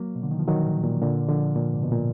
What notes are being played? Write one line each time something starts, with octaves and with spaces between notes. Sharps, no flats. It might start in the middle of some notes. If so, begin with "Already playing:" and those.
Already playing: F#3 A#3
B2
D3
D#3
F3
D#3 F#3
A#2
A#2
A#2 D3
D3 F3
A#2
G#2
B2
A#2